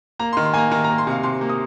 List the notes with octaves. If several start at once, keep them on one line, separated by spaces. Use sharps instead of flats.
A#3 A#5
C6
D#3
C6
A#3 G#5 A#5
D#3 A#5
A#5
A#3
C6
C3 F5
C3 C6
A#3
D#6